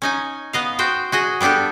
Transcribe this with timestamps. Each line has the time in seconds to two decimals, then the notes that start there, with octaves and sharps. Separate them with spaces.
0.02 C#4 D#4 G#5
0.53 B3 D#5 F5
0.79 F#4 C5 G5
1.12 F#4 G#4 D#5
1.41 G3 B3 D4 G4 A4